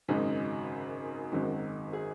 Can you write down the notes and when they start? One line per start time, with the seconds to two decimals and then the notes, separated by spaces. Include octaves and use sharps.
0.08 G#1 F#2 C#3 G#3 D#4
1.32 G#1 F#2 D#3 G#3 F#4
1.93 G#4